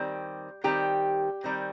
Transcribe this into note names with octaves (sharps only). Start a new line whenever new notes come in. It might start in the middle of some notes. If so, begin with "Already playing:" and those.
Already playing: D#3 G3 C4 G4
D#3 G3 C4 G4
D#3 G3 C4